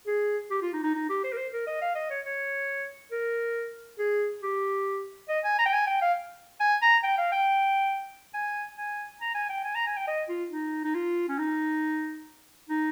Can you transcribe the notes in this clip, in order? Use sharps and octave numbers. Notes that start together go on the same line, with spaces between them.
G#4
G4
F4
D#4
D#4
D#4
G4
C5
A#4
C5
A#4
D#5
F5
D#5
C#5
C#5
A#4
G#4
G4
D#5
G#5
A#5
G5
G#5
G5
F5
G#5
A#5
G5
F5
G5
G#5
G#5
A#5
G#5
G5
G#5
A#5
G#5
G5
D#5
F4
D#4
D#4
F4
C#4
D#4
D#4